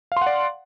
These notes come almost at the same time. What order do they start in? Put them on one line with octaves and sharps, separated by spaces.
F5 C6 F#5 D5